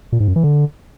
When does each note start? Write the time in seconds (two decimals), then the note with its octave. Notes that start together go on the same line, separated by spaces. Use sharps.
0.12 A#2
0.20 G#2
0.28 F#2
0.36 E3
0.43 D3